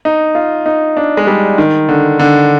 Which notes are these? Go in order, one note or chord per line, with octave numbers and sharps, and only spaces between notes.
D#4
F4
D#4
D4
G#3
G3
D#3
D3
D3